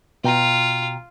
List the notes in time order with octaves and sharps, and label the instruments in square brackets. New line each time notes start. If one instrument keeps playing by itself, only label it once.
[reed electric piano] B2 G5 A#5 [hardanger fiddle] F4